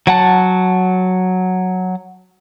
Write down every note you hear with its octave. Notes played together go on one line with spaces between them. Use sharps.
F#3 F#5 A5